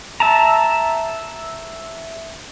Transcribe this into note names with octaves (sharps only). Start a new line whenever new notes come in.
E5 A5 A#5